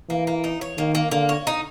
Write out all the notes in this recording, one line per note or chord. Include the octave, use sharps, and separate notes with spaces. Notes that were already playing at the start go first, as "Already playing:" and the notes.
E3 A#3
A#3
D#4
C#5
D#3 A#3
A#3
D3 A#3
C#5
D#4